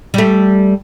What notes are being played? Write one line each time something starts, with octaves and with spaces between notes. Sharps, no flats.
G3 A3